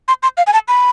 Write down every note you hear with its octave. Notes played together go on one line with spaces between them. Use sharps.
C6
C6
F5
G#5
A5
B5